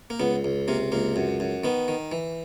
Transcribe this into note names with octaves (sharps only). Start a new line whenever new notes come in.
A#3
C#2 B3
C#2
C3 A#3
C#2 A#3
F#2
F#2
D#3 B3
D#3
E3